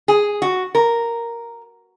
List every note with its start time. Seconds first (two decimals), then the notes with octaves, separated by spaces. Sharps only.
0.08 G#4
0.42 F#4
0.75 A#4